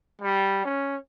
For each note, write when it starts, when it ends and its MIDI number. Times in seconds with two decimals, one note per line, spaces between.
0.21 0.61 55
0.65 0.96 61